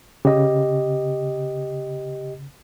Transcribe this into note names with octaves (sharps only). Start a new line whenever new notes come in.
C#3 G4 D#5